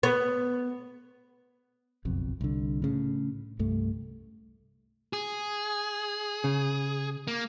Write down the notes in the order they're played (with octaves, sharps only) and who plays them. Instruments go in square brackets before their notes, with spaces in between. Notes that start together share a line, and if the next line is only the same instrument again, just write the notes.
[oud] B3
[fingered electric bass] F#1 B1 F2
C2 D3
A2 C#3
C2 G2 A3
[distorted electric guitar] G#4
[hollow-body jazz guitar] C#3
[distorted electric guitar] A#3